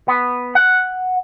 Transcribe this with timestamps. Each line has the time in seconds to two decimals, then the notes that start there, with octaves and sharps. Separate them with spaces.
0.08 B3
0.55 F#5